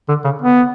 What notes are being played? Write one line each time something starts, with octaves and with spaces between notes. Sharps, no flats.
D3
C#3
B3